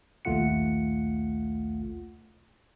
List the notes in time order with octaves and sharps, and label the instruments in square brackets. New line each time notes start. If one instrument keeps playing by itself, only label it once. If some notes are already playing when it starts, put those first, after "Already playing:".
[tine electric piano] A#1 D#2 A3 F4 F#5 C#7